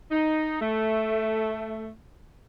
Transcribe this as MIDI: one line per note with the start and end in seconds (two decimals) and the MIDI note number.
0.11 0.61 63
0.61 1.90 57